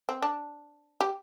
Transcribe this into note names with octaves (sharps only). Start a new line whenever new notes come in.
C4
D4
G4